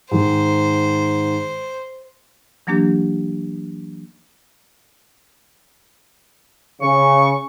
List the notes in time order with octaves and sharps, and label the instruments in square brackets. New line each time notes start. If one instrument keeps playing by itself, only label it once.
[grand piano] G#2 D#3 [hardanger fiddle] C5
[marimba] E3 F#3 A#3 D4 G4
[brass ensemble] C#3 [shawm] C#6